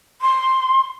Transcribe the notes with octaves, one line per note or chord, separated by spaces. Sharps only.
C6